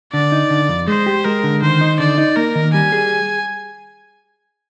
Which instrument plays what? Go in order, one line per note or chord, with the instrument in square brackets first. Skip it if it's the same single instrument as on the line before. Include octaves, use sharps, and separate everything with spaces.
[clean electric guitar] D3 [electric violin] D5
[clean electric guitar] D#4
D3
F2
[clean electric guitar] G#3 [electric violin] C5
[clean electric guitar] G4
[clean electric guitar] G#3 [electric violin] A#4
[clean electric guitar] D3
[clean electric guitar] D#3 [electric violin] C5
[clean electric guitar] D#4
[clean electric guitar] D3 [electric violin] D5
[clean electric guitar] D#4
[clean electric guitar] A#3 [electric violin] A#4
[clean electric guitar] D#3
[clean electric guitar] G3 [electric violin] G#5
[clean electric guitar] G#4